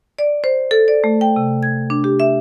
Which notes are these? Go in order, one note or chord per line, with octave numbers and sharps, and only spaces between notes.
D5
C5
A4
D5
A3
G5
C3
G#6
D4
G4
E5